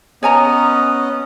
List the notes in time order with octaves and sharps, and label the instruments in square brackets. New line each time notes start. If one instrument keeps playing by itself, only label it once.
[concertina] B3 C#4 D#5 [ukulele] C#5 G#5 A#5